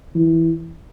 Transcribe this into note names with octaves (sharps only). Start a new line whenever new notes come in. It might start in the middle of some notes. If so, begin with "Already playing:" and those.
E3